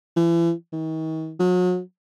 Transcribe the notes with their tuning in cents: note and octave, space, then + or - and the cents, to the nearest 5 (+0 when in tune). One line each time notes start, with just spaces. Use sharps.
E3 +35
D#3 +40
F#3 -35